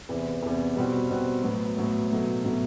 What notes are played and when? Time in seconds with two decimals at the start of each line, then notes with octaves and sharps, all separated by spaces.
0.09 E2 C3 E3
0.43 E2 C3 E3
0.76 B2 G3 C4 F#4
1.10 B2 G3 C4 F#4
1.43 A2 F#3 B3
1.77 A2 F#3 B3
2.11 B2 F#3 A3
2.45 B2 F#3 A3